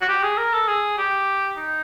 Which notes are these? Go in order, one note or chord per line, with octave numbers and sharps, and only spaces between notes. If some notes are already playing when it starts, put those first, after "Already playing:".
F#4
G4
G#4
A#4
A4
G#4
G4
D#4